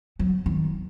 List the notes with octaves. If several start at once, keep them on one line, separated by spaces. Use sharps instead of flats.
F#3
D#3